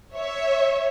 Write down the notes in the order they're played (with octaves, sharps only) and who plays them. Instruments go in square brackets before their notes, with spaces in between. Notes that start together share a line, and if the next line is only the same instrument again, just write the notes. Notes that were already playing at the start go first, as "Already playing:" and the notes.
[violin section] C#5 E5